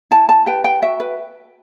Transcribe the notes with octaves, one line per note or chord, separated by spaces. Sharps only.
E4 A5
A5
G4 B4 G5
G5
F#4 E5
B4